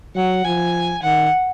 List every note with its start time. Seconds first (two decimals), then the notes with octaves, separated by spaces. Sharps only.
0.16 F#3 F#5
0.45 F3 G#5
1.02 D#3 F#5